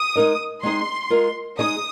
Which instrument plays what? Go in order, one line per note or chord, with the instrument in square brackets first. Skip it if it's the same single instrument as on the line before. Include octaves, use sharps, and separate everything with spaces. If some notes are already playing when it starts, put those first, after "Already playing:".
Already playing: [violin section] D#6
[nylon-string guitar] G#3 D#4 A#4 D#5
[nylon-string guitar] G#3 C4 D#4 G#4 D#5 [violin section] C6
[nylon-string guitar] G#3 F4 A#4
[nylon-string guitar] G#3 D#4 G#4 D#5 [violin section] D#6